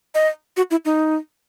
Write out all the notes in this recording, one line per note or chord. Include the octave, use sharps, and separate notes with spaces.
D#5
F#4
E4
D#4